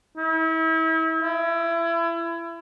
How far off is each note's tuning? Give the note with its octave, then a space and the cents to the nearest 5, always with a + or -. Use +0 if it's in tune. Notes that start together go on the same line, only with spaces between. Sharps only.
E4 -35
E4 +30